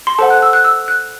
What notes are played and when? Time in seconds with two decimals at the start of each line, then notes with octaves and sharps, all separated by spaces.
0.07 C6
0.18 A4 C5 F#5 A5
0.30 F#6
0.42 E6
0.53 F#6
0.64 E6
0.88 F#6